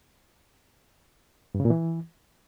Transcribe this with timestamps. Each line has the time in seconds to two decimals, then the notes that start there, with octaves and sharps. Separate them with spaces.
1.55 G2
1.60 C#3
1.65 A#2
1.70 E3